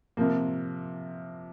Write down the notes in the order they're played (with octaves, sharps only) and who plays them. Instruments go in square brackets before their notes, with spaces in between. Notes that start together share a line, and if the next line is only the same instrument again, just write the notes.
[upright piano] C3 F3 A#3